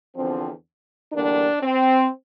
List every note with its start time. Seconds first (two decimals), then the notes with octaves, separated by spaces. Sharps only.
0.16 E2 D3 F3 C4
1.12 E2 D3 G3 A#3 D4
1.62 C4